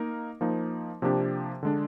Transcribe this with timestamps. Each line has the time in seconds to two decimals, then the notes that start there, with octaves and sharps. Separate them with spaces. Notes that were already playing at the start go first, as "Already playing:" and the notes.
Already playing: A#3 D#4 A#4
0.41 F3 A#3 D#4
1.02 C3 F3 A#3 D4 G4
1.63 D3 G#3 D4